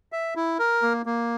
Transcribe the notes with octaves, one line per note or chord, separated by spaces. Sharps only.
E5
E4
A#4
A#3
A#3